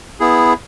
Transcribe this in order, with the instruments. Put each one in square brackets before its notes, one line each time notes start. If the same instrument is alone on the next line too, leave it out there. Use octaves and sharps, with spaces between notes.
[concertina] B3 E4 G#4